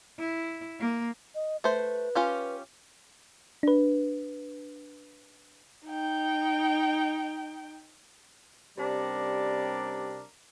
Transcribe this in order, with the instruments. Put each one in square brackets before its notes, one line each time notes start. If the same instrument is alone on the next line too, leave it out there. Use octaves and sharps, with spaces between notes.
[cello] E4
A#3
[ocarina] D#5
[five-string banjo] A3 C5 [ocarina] B4
[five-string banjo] C#4 F4 G4
[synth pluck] D4 B4
[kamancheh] D#4 G5
[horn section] C3 G3 C#4 D4 A#4 D5